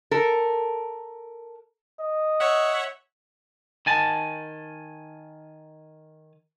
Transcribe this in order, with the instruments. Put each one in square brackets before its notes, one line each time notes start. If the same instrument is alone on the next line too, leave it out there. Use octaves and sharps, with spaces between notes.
[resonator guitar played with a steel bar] A4 A#4
[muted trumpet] D#5
[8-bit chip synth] C#5 E5 F#5
[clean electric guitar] D#3 G#5 A5